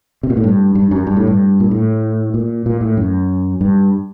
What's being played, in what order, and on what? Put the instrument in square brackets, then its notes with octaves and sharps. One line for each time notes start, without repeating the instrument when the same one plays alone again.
[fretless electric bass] C3
A#2
A2
G2
G2
F#2
G2
A2
G2
A#2
A2
A#2
A#2
A2
F#2
G2